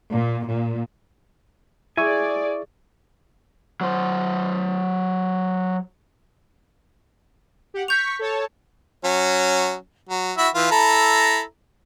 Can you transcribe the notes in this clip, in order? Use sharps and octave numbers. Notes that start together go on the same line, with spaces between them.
A#2
A#2
E4 G#4 D5 E5 G#5 C#6
F#3 C5
G4 F#5
C#6 G6 B6 F7
A4 C#5 A5
F#3 C#4
F#3
E4 F#4 E5
E3 F4
E4 A4 A#5